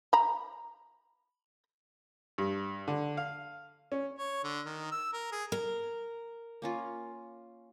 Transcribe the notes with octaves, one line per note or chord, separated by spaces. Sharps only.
A#5 B5
G2
D3
F5
C#4
C#5
D3
D#3
E6
A#4
G#4
A#4
A#3 C#4 F4